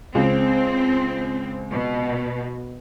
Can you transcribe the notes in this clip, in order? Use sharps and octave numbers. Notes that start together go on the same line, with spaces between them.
C#2 C4
B2